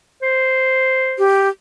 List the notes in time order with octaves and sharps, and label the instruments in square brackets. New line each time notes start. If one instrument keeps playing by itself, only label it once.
[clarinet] C5
[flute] G4